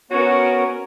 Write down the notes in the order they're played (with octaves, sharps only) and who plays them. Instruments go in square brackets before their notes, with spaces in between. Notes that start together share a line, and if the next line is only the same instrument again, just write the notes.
[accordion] B3 C#5 [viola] C#4 A#4 [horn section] F#4